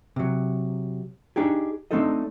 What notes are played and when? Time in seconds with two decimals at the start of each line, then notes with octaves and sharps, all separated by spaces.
0.16 C3 F#3
1.36 D4 D#4 G4 G#4
1.91 A3 C4 D4 D#4 A4 D#5